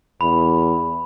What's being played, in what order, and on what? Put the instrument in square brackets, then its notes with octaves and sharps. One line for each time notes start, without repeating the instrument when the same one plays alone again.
[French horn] E2 [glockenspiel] B5